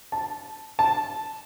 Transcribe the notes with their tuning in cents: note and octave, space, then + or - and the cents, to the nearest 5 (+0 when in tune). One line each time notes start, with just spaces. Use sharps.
A5 +0
A5 +0